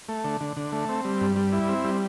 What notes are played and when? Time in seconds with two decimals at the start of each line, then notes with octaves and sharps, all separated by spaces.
0.09 A3
0.24 D3
0.41 D3
0.57 D3
0.73 A3
0.89 C4
1.05 G3
1.21 G2
1.36 G3
1.53 E4
1.69 C4
1.84 G3